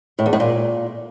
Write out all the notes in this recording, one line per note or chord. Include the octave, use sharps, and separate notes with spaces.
A2
E2
A2
A#2